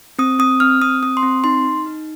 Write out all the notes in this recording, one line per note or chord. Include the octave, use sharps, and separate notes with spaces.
C4 D#6
C4 D#6
C4 F6
C4 D#6
C4 D#6
C6
C4
D#4 C6
D#4
D#4